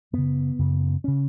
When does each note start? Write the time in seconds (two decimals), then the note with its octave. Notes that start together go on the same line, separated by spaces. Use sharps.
0.13 F#2 C#3 B3
0.59 F#2 C#3
1.04 C#3 C#4